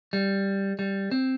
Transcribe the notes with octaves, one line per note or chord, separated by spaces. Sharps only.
G3
G3
C4